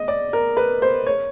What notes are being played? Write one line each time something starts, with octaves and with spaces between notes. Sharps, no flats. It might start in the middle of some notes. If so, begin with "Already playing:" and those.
Already playing: D#5
D5
A#4
B4
C5
C#5